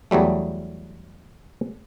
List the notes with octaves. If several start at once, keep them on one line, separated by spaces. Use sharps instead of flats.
E2 F#3 G3 A3